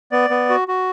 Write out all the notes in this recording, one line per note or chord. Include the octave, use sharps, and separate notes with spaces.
B3 D5
B3
F#4
F#4